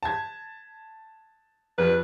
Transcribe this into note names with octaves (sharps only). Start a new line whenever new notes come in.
A5 G#6
F2 B4